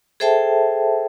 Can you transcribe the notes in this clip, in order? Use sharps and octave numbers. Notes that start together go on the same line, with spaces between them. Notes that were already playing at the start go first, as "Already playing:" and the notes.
G#4 A4 C5 E5 G5 A5